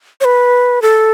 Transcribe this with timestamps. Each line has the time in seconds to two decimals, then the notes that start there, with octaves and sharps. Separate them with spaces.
0.21 C#5
0.25 B4
0.82 A4